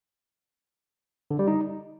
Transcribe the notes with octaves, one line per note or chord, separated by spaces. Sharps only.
D3
G3
D#4